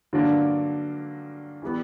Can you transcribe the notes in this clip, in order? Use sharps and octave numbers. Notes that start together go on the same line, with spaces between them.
G2 D3 F#3 A#3 D4
E3 G3 B3